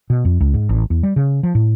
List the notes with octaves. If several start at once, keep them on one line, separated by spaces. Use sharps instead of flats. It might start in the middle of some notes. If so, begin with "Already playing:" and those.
B2
F2
C#2
G#2
A1
E2
G3
C#3
F3
A2